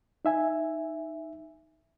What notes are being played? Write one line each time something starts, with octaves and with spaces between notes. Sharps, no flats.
D#4 E5 G#5